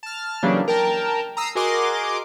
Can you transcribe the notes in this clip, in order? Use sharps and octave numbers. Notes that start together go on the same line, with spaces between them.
A5 F6
C#3 E3 F#3 G3 A#3 D4
A#4 G5 A5 A#5
A#5 D#6 E6 C7
F#4 G#4 A#4 D#5 C6 D6